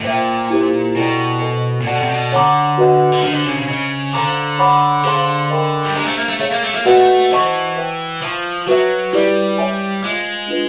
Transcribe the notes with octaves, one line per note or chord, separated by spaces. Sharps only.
A2
A#2 C5 E5 G5
E4 G4 C5
B2 E4 A4 D5 G5 A#5
A4 C5 D#5 G#5
A#2
B2 A4 D5 F#5 A5
C3
B2
D3 C#5 F#5 A#5 D6
F#4 B4 D#5 F#5
D3
D#3 D4 G4 C5
D3
C#3
C#3
C#3 C5 D#5 G#5
D3 A4 C5 F5 A#5 D6
C#5 F#5 B5 D6
D3 G#4 C5 F5 A5 C6
A#4 D#5 G5 B5
G3
G#3 D4 G4 C5 F5 A#5
A3
A#3
A3
A3 G#4 C#5 F5
A#3
A3
A#3
A3 F#4 B4 D#5 F#5
E3 C5 D#5 F#5 A5 C#6
B4 E5 G5
F3 C5 E5 A5 C#6
F#3 F#4 B4 E5
G3 E4 G4 B4 D5
C#5 E5 G#5
G#3 F4 G#4 C5 F5
D4 F4 G#4 B4